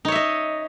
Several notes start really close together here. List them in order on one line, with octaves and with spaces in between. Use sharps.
D#4 C#5 E5 D#5